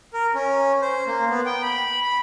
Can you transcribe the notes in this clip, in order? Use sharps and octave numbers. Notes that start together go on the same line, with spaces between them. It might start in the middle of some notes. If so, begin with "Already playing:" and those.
A#4
C#4
C5
A#3
B3
G5
B5
B5